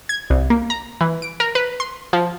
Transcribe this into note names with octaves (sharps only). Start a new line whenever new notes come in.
G#6
C2
A#3
A#5
E3
D7
A#4
B4
C6
F3